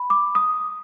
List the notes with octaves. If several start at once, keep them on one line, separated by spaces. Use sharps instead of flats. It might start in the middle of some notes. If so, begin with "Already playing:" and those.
Already playing: B5
D6
D#6